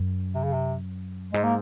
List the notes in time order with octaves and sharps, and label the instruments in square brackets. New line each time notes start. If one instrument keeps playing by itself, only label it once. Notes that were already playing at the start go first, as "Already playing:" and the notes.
Already playing: [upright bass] F#2
[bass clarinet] C3
C#3
C3
[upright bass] G#2 [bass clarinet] G#3
[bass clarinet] A#3